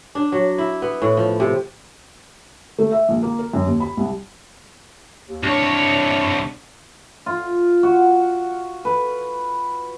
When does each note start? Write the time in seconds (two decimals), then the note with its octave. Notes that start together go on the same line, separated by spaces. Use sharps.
0.15 D4
0.32 F#3
0.58 E4
0.82 B3
1.02 A2
1.17 F3
1.40 C3
2.79 A3
2.92 E5
3.09 A#1
3.23 A#3
3.39 A#4
3.53 F#2
3.66 D#2
3.80 B5
3.97 C2
5.28 D#2
5.43 C2 D4 C#5
7.26 F4
7.83 F#4
8.85 B4